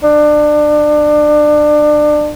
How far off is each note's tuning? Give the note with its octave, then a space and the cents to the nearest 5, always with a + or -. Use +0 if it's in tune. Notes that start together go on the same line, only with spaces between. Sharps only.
D4 +25